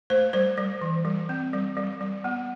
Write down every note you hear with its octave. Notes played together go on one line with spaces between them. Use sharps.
A3 C5
G3 C5
G3
E3
G3
C4
G3
G3
G3
B3